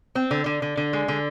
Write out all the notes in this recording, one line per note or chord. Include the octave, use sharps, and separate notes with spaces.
C4
D3
D3
D3
D3
G#3
D3